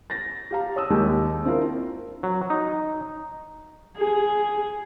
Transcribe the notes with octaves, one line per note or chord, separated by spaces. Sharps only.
A6 A#6
G4 F5 A#5
C#5 A5 D#6 E6
D#2 G#3 G4
C4 D4 E4 F4 A#4
F#3
D#4
G#4